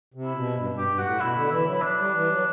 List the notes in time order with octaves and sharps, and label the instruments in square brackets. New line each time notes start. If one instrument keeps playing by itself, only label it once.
[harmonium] C3
[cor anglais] E4
[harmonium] B2
G2
G2
[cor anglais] G4
[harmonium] G2
[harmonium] A2 [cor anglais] F#4
[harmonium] B2 [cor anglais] E4
[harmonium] D3
[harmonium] E3 [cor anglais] E4
[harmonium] F#3
[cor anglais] E4
D4
[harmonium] G3
E3
F#3